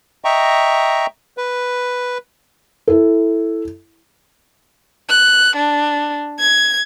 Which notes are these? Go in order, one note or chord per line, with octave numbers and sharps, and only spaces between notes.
D#5 E5 G5 A#5 C#6
B4
E4 A4
F#6
D4
G#6